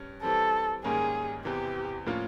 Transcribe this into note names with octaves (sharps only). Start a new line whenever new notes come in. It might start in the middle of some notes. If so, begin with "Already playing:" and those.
Already playing: G2 C#4
E3 G3 C4 A4
G#2 D#3 G3 A#3 C#4 G#4
E2 C3 E3 G4
A2 F3 A#3 C#4 F4